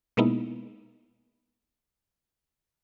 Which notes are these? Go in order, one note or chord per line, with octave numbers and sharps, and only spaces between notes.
B2 G#3 A#3 B3 D#4 E4